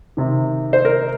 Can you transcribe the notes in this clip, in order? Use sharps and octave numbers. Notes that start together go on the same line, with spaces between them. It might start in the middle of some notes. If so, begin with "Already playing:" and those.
C3 D#3
C5
A#4